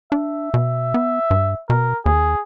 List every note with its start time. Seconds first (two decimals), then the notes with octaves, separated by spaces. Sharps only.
0.12 D4 E5
0.54 B2
0.94 B3
1.31 G2
1.70 B2 A#4
2.06 D#2 G#4